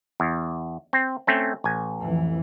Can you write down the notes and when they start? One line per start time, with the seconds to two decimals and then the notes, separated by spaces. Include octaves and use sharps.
0.20 E2
0.93 C4
1.27 A3 C4 C#4
1.64 A1 G#5
2.01 F2 E3